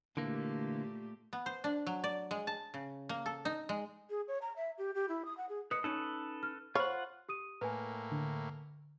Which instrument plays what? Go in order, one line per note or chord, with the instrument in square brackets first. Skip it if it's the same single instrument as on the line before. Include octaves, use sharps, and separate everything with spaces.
[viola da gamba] A#2 A3 G4 [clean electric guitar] D3 E3 A#3
[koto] B3
C5
D4
F#3
D5
G#3
A5
C#3
A#3
A4
D#4
G#3
[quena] G#4
C#5
A#5
E5
G4
G4
E4
D#6
F#5
G#4
[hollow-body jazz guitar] B4 D#5 [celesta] D#6 C#7
[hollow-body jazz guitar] C#4 D#4 [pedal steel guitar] A4 B4
[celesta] F6
[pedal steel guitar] F4 F#5 [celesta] C5 F6 [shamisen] C#5 [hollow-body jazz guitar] B5
[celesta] G4 D#6 D#7
[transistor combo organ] A2 A#3 [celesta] B4 G#5
[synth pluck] D3